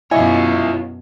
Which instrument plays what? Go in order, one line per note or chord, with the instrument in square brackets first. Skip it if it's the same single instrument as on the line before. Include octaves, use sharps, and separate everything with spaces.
[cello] F#2 B2 [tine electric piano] E4 [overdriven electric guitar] F4 C#5 [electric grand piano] D#5 E5 G#5